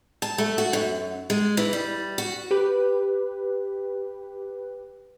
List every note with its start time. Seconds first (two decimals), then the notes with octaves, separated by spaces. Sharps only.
0.22 A5
0.38 A3
0.58 F#4
0.73 F#2
1.30 G#3
1.57 E3
1.73 G3
2.18 F#4
2.51 G4 B4